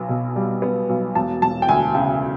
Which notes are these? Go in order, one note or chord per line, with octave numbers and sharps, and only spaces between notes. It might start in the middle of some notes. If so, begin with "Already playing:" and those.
Already playing: B1 B3
B2
G3
B3
B1
E1 A5
E1 A5
G5
D2 G#5
C#3 G5